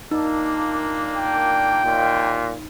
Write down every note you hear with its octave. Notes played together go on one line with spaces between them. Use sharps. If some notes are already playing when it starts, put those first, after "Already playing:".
A#2 A#3 D4 D#4
G5
D#2 A#2